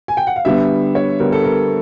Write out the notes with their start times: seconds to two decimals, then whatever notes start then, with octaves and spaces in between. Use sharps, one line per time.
0.08 G#5
0.17 G5
0.27 F#5
0.36 F5
0.45 D3 G3 B3 E5
0.95 C#5
1.20 D3 G3 B3 A#4
1.32 A4
1.45 A#4